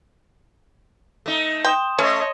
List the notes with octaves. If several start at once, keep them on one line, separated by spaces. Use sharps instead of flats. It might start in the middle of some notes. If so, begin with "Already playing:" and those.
A3 D#4
G5 C6 D#6 E7
A3 C#4 C#5 D#5